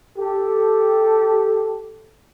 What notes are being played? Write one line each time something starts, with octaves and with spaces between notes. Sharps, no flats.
G4 A4